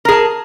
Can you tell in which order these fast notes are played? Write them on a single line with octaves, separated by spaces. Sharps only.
A#4 G#4 A5